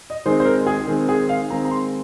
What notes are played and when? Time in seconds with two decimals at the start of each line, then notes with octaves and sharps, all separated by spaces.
0.10 D#5
0.26 D#3 G#3 C4 C5
0.40 C5
0.45 A#4
0.66 G#4
0.87 D#3 G#3 C4
1.09 G#4
1.29 F5
1.50 D#3 G#3 C4 A#5
1.65 A#5
1.71 C6